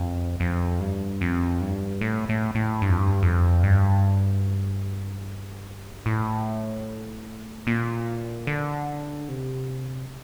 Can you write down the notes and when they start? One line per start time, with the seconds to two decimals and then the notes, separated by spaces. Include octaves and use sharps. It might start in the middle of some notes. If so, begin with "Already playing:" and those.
Already playing: F2
0.40 F2
0.80 G2
1.21 F2
1.61 G2
2.01 A2
2.29 A2
2.55 A2
2.82 G2
2.90 F2
2.98 G2
3.23 F2
3.63 G2
6.06 A2
7.67 A#2
8.47 D3
9.29 C3